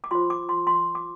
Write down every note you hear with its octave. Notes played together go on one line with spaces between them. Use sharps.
D6
F4 C5 C6
D6
C6
C6
D6